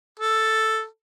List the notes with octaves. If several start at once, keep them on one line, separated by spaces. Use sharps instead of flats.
A4